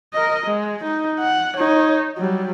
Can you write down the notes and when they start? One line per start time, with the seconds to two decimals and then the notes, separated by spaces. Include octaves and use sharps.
0.14 A#4 D#5
0.46 G#3
0.84 D#4
1.20 F#5
1.57 D#4 C#5
2.18 F#3 G3